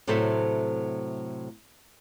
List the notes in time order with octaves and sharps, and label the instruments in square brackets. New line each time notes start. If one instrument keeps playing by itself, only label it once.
[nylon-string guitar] A2 C3 F#3 A4 C5 E5